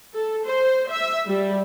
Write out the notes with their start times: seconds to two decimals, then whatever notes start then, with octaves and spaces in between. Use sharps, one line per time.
0.14 A4
0.45 C5
0.90 E5
1.29 G3